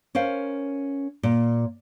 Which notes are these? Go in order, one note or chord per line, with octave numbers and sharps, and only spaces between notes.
C#4 A#4 C5 F5
A#2